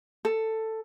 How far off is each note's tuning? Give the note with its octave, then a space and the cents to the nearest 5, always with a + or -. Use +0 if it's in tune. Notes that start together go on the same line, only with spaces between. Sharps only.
A4 +10